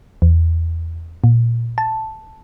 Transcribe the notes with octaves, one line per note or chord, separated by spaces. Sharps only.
E2
A#2
A5